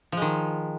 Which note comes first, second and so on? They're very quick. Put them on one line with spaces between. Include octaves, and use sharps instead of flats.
F3 G#3 D#3